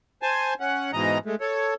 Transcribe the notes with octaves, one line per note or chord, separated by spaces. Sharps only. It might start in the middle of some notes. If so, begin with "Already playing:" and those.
C5 G#5 A5
C#4 F#5
G#2 B2 E3 D#5 A#5
G#3 A3
A4 C#5